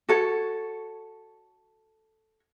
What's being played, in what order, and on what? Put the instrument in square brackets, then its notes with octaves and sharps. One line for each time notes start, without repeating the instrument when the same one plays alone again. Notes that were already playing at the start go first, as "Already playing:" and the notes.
[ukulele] F#4 A4 C#5